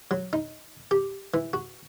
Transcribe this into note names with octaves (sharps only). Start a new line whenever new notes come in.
F#3
D#4
G4
E3
F#4